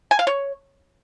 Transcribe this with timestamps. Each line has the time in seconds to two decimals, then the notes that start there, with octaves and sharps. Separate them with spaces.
0.11 G#5
0.19 F5
0.27 C#5